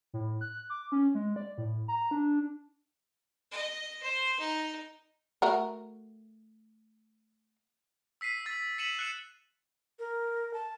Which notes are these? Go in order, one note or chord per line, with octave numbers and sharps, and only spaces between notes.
A2
F#6
D6
C#4
G#3
D5
A2
A#5
D4
D#5
C5
D#4
A3 F#4 A#4
E6 B6 C7 D#7
E6 A6
B6 C#7 D#7 E7 F#7
F#6 C#7 E7
A#4
A5